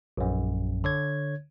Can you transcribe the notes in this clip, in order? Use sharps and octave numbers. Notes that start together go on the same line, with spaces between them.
A#1 F#2
D3 C#5 G#6